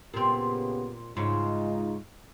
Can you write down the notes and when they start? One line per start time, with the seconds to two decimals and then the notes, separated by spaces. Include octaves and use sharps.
0.14 A#2 C#3 B3 C4 G4
1.17 G#2 C#3 G#3 D#4 F4